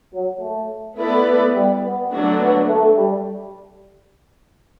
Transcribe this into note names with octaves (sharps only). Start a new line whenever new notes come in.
F#3
A3
A3 B3 E4 B4 D5
A3
G3
B3
D3 F#3 A3 D4 F#4
B3
A3
G3